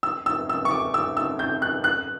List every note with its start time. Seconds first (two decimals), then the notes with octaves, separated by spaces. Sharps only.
0.03 E6
0.26 E6
0.49 E6
0.65 C#6
0.71 D6
0.94 E6
1.17 E6
1.39 G6
1.62 F#6
1.84 F#6